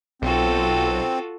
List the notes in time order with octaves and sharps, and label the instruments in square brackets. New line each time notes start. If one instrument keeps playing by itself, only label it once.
[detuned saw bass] B1 [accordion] C4 [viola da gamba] F4 F#4 A4